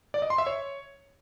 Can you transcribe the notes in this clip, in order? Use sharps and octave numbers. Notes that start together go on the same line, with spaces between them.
D5
D#5
C6
E5
C#5